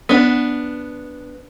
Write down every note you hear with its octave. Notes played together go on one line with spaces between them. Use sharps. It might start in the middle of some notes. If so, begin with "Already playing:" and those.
B3 D4